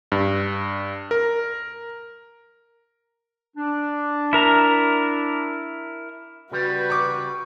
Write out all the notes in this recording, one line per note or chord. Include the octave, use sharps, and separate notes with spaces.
G2
A#4
D4
E4 A#4 A#5
C#3 G3 F#4 B4
C#6 D6